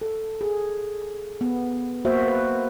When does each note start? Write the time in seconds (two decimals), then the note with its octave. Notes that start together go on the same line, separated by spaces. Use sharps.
0.01 A4
0.41 G#4
1.41 B3
2.05 A#3 F#4 C5 E5
2.28 B4